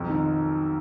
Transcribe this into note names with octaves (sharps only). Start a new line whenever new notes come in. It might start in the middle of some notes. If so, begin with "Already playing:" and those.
Already playing: B1 F2
D#3